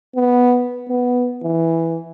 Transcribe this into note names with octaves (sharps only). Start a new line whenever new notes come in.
B3
B3
E3